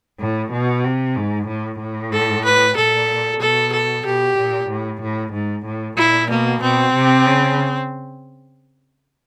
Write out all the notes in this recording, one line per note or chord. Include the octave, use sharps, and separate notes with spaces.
A2
B2
C3
G#2
A2
A2
A4
B4
A#2 A4
B2 A4
A4
B2 G4
A#2
A2
A2
G#2
A2
A#2 E4
B2 A#3
B2 C4
C3
C#3